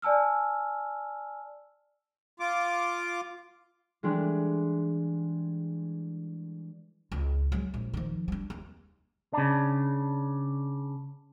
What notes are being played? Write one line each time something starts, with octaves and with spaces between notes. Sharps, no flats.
D5 G#5 A5 E6 F6
F4 D6
E3 G3 G#3 D4
C#2
F#3 G#3
A#1
D#3 F3
G3 D4
D#2
C#3 D4